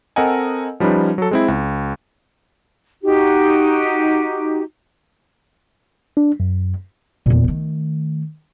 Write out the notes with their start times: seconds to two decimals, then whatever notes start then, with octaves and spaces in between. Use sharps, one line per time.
0.16 C4 A4 A#4 D#5 F#5 G#5
0.80 F3 G3 C#4 D#4 B4
1.18 F#3 A4
1.31 G#3 C4 E4
1.48 C#2
3.03 D#4 F#4 G4
6.17 D4
6.40 F#2
7.26 E2 A#2
7.44 D#3 A3